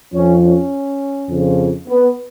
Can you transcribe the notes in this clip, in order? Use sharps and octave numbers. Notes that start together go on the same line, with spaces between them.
F2 F3 C#4
C#4
F2 C#3 F3
B3